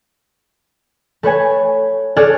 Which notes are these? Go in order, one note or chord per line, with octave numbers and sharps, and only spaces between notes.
A3 B4 C#5 G#5
G#4 A4 C#5 D5 F6 F#6